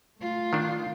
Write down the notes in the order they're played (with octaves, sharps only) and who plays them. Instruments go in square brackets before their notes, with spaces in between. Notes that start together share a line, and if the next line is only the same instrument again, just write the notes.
[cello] A3 F4
[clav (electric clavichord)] D#3 D4